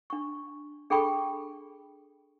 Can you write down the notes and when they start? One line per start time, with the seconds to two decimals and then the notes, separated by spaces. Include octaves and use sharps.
0.10 D4 C#6
0.90 D4 G#4 A4 G5 B5 C#6